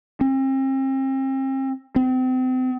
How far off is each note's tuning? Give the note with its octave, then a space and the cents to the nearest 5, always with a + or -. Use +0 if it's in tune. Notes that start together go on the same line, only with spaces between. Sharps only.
C4 +40
C4 -35